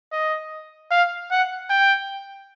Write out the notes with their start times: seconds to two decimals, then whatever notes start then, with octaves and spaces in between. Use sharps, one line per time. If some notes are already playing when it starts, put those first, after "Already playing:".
0.12 D#5
0.91 F5
1.31 F#5
1.70 G5